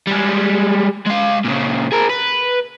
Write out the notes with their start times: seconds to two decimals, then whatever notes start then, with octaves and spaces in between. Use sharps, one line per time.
0.07 G3 G#3
1.06 G#3 F5
1.45 A#2 C#3
1.92 G#4 A#4
2.10 B4